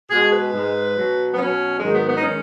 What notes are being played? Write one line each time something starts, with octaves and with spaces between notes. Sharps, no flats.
B2 G#3 G#4
B4
G#2 G#3
B2 F#3
B3
B2 F#3 C#4
G#2 D#3 F#3 G#3
B3
B3
D#4
D#3 G#3 C#4